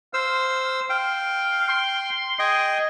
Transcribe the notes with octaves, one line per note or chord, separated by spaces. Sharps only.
C5 F5 E6
F5 G5
C6
G#4 D#5 G5